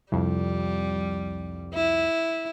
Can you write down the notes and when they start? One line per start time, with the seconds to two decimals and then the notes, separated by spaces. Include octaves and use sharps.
0.12 C2 F2 G3
1.75 E4